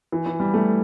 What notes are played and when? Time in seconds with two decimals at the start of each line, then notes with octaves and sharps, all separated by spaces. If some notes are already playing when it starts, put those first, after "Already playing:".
0.12 E3
0.26 E3
0.40 G3
0.54 A3